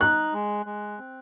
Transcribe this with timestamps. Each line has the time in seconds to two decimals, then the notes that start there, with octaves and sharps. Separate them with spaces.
0.01 D#4 F#6
0.33 G#3
0.66 G#3
0.98 C4